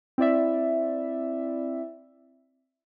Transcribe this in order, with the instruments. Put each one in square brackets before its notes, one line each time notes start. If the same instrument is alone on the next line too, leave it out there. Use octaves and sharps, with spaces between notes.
[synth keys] C4 E4 D5 E5